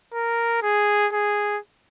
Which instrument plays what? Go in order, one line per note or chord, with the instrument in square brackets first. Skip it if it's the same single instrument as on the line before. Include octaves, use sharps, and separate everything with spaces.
[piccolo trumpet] A#4
G#4
G#4